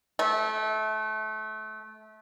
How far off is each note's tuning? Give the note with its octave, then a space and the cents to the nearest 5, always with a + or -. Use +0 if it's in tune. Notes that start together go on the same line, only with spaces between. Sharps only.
A3 -25